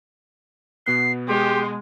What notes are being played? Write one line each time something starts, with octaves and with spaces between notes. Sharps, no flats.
B2 B3 F#6 C7
G#3 G4 C6